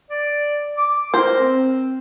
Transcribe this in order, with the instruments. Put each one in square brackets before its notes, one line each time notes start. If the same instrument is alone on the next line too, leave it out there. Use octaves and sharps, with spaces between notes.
[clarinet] D5
D6
[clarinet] A#4 [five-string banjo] C5
[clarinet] C4